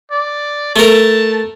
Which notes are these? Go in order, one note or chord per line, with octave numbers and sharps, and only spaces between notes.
D5
A3 A#4 A5